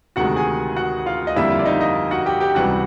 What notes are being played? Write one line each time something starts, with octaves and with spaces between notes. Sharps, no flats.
D2 C3 D#3 G#3 F#4 F#5
G#4 G#5
F#4 F#5
F4 F5
D#5
F2 D3 G3 A#3 E4 E5
F4 F5
D5
D#4 D#5
D#4 D#5
F#4 F#5
G4 G5
G4 G5
C#2 C3 E3 G3 F#4 F#5